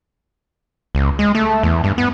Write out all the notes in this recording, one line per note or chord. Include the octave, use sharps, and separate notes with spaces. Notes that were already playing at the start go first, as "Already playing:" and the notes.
C#2
G#3
A3
E2
G2
B3